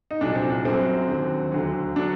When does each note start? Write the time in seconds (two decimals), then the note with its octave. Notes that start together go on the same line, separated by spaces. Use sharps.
0.11 D#4
0.21 C2 A#2 F#3 D4
0.35 C4
0.50 D4
0.65 F#2 F#3 C4
1.08 D#2 D3 F#3
1.52 D2 D3 F#3
1.96 D3 F#3 D4